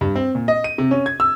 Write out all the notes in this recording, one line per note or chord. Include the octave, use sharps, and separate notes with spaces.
G2
C4
A#2
D#5
D#7
C3
C#4
G#6
E6